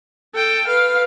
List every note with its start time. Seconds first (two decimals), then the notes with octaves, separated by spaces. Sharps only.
0.34 A4 G5
0.67 B4 F5